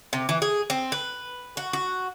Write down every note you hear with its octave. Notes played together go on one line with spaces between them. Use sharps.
C3
E3
G#4
C4
B4
F#4
F#4